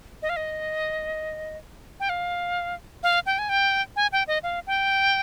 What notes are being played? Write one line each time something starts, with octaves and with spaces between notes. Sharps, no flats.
D#5
F5
D#5
G5
F5
F5
G5
G#5
G5
G#5
G5
D#5
F5
G5